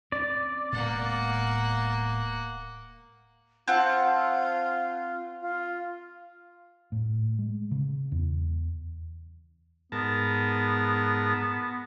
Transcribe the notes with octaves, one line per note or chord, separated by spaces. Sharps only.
C4 C#4 D5
D1 A2 G#3 A#3 B3 F#5
C4 F4 F#5 A5
F4
A2
G#3
C#3
E2
G#2 B3 A#4 A5